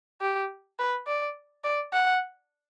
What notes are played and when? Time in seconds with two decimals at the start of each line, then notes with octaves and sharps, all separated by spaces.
0.21 G4
0.79 B4
1.07 D5
1.64 D5
1.93 F#5